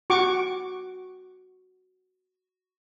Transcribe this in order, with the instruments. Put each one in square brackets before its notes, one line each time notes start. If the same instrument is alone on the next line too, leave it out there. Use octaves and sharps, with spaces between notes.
[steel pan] F#4 C#6 D6